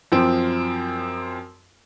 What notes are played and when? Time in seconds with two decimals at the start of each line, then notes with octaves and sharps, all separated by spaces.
0.12 F#2 F3 C4